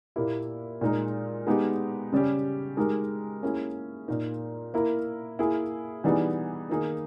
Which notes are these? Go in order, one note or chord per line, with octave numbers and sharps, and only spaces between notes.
A#2 A#3 E4 G4
A#2 G#3 D#4 A#4
G#3 B3 D#4 G4
C#3 G3 C#4 G4
G#3 D#4 G4 A#4
A#3 C#4 E4 G#4
A#2 A#3 D#4 A#4
A#3 E4 A#4
A#3 E4 G#4
E3 G3 B3 D#4 G#4
D#3 A#3 D#4 G#4